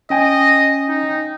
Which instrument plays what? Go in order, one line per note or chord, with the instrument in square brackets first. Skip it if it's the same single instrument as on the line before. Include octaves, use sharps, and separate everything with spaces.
[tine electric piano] C#4 G5 G#5 [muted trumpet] D#5
[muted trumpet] D#4